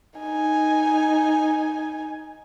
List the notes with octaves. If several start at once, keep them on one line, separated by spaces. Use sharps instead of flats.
D#4 G#5